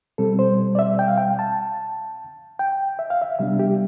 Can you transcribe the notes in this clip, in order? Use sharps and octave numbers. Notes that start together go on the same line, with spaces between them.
B2 G3 C4 A4
C5
D5
E5
G5
F5
G5
A5
G5
E5
F5
E5
C3 G3 B3 D4 E5
G4